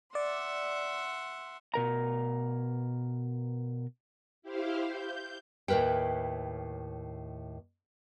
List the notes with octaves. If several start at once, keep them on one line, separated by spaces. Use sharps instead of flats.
D5 E5 F#5 C6
B2 A#4 A#5
E4 G4 C5 F5
G6
D#2 A2 A#4 B4 G5